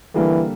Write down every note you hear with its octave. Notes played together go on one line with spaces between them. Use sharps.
D3 E3 G3 A#3